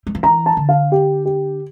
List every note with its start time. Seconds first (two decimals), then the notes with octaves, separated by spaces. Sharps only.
0.07 G3
0.15 F3
0.23 E3 A#5
0.46 A5
0.57 D3
0.69 F5
0.92 G4
1.25 G4